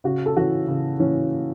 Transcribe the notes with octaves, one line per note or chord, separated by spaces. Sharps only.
C#3 F#4
A4
E3 C#4 F#4
C#3
E3 C#4